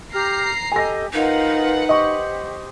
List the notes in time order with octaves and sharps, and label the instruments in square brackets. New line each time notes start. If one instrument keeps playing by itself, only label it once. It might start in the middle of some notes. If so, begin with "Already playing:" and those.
[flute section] G4 F6 [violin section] A#5 C7
[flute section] G4 A4 D#5 [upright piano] G#5 A#6
[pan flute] D#4 [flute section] F4 A#4 D#5 [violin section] B4 F#5
[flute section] G4 C5 [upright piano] D#5 C#6